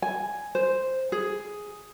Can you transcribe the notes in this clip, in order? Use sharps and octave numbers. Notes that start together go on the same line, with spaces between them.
G#5
C5
G#4